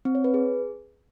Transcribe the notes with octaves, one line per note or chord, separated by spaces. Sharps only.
C4
C#5
B4
G#4